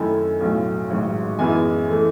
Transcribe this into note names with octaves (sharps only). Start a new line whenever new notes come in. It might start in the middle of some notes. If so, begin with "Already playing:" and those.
Already playing: F#2 D#3 A3 E4 G#5
B1 A2 F#3
A1 G#2 D#3 F#3
F#2 E3 G#3 B3 E4 G#5
E3 A3